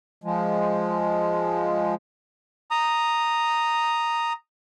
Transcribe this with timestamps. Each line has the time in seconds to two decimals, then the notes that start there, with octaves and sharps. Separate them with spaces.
0.24 F3 G#3
2.71 A#5 D#6